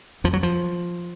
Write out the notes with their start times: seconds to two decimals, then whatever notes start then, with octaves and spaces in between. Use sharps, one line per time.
0.24 F2 F3
0.33 F#3
0.43 F3